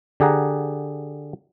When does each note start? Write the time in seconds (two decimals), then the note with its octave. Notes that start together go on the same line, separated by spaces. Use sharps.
0.20 D3 G4 G#4 F#5 A#5